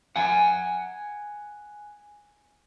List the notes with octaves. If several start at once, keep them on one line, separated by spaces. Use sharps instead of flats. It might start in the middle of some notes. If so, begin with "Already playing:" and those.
F#5 G#5